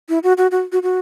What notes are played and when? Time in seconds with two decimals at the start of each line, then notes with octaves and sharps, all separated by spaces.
0.09 E4
0.23 F#4
0.38 F#4
0.51 F#4
0.72 F#4
0.83 F#4